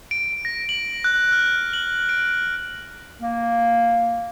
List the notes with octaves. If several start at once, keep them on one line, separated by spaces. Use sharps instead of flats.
D7
A#6
F#7
F#6
F6
F#7
D7
A#3